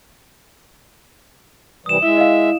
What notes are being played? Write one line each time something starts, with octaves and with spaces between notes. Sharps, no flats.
C3 E3 G3 D#6 E7
G#3 E4 E5
D#5 F5